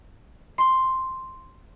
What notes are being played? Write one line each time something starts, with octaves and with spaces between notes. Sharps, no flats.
C6